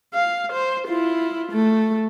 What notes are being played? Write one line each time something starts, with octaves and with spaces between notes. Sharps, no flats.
F5
C5
E4 F4
A3